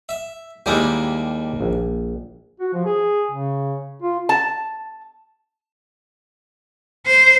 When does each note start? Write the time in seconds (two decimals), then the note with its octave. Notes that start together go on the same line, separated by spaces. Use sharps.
0.09 E5
0.66 D#2 G3 G#3 A#3 E4 G4
1.61 A#1
2.60 F#4
2.73 F3
2.85 G#4
3.31 C#3
4.02 F4
4.29 A5
7.07 C5